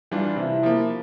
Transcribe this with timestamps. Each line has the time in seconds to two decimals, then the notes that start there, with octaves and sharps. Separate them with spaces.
0.11 E3 G3 D4 F4
0.36 C3 E4
0.63 F3 A#3